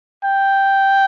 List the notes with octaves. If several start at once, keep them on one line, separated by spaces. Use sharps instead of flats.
G5